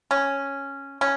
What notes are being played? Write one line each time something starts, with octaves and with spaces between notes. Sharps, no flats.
C#4
C#4